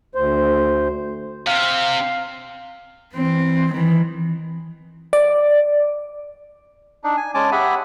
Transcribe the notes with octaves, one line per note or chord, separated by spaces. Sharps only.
D2 C5
C3 F5
E3 C4
D#3 E3
D5
D4 D#4
G#5
G#3 C#4 G#5 A5 D6
G4 G#4 E5 F#5 G#5 B5